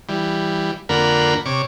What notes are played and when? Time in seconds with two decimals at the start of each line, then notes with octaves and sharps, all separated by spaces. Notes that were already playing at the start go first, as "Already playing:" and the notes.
0.09 E3 G3
0.89 F2 D3 A#3 A#4 F#5 B5
1.46 C3 C#5 D6